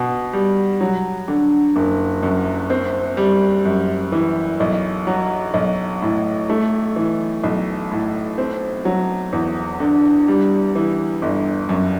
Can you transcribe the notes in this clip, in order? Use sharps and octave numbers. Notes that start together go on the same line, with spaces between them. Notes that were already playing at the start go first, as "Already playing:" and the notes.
Already playing: B2
G3
F#3
D3
F#1
F#2
C4
G3
F#2
E3
B1
F#3
B1
A2
A3
E3
B1
A2
C4
F#3
E2
D3
G3
E3
G1
F#2